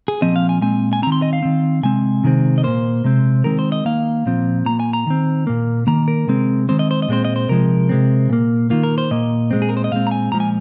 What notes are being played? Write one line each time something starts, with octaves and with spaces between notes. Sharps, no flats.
G#4
A#2 F3 C4 D#5
F5
G#5
A#2 G#3 C4 G#5
G#5
D#3 C4 A#5
C6
D#5
F5
D#3 C4
C3 G#3 C4 G#5
C3 D#3 G#3 C4
D#5
A#2 A#3 C5
C3 G#3 C4
D#3 G#3 C4 A#4
C5
D#5
D#3 A#3 F5
A#2 F3 C4
A#2 A#3 A#5
G#5
A#5
D#3 C4
A#2 A#3
D#3 A#3 A#5
A#4
C3 G#3 C4
D#3 G#3 C4 C5
D#5
C5
D#5
A#2 G#3 C4 C5
D#5
C5
C3 F3 G#3 A#4
C3 G#3 C4
A#2 A#3
D#3 A#3 F4
A#4
C5
A#2 A#3 D#5
A#2 G#3 C4
G#4
A#4
C5
D#5
A#2 G#3 C4 F5
A#5
G#5
A#2 F3 G#3 A#5
G#5